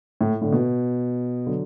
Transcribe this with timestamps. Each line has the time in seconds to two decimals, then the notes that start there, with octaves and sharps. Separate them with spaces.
0.21 A2
0.41 A2 D3
0.52 B2
1.47 D3 F#3